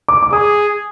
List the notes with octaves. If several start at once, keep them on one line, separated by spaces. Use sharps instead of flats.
D6
D6
G#4 D#6